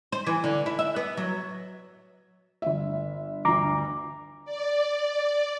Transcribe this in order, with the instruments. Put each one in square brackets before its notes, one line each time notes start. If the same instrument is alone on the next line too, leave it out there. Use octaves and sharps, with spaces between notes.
[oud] C5
E3
D3
E4
E5
B3
F#3
[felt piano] G1 E5
[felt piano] G1 D2 [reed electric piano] A#5 D6
[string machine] D5